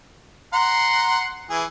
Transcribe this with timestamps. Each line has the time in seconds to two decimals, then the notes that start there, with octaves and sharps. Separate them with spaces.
0.53 F#5 A#5 C6
1.50 E3 G#4